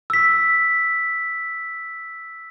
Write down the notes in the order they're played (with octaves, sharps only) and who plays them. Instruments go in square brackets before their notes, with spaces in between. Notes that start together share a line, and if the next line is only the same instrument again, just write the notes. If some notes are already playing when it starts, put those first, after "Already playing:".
[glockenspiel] E6 B6